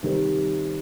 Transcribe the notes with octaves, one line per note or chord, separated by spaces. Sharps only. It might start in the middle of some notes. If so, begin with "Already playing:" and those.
C3 D#3 G3 C4